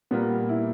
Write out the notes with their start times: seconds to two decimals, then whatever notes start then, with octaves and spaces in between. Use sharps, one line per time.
0.11 A#2 G3 A#3 B3
0.49 E4